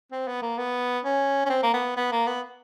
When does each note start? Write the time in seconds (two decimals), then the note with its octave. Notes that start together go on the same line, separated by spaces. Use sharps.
0.12 C4
0.28 B3
0.42 A#3
0.58 B3
1.05 C#4
1.46 C#4
1.50 C4
1.63 A#3
1.74 B3
1.96 B3
2.12 A#3
2.27 B3